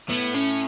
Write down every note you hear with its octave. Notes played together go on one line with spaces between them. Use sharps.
A2 B3
C#4